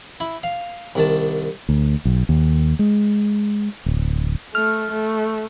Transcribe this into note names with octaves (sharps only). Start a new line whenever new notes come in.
E4
F5
C2 D#3 A5
D2
B1
D#2
G#3
D1
A3 F6
A3